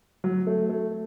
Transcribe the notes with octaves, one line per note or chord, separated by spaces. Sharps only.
F#3
A3
A3